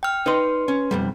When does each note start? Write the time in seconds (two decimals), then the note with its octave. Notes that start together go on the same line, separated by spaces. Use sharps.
0.03 G5 F6
0.26 D#4 B4 D5 D#5 C6
0.68 C#4
0.91 B1 F2 G3